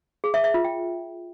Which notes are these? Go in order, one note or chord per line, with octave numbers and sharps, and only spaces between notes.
G#4
E5
E5
F4
G5